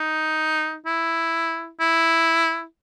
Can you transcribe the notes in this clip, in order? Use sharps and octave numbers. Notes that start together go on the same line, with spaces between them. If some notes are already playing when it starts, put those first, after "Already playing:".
Already playing: D#4
E4
E4